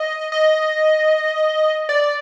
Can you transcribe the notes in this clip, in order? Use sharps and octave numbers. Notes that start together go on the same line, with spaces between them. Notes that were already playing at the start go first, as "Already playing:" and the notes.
Already playing: D#5
D#5
D5